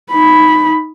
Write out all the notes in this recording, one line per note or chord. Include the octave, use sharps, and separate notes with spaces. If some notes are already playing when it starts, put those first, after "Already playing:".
D#4 B5